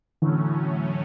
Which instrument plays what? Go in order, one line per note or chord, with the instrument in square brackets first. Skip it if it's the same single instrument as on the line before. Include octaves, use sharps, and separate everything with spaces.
[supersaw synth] A2 F#3 A3 C#4 [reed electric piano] D3 E3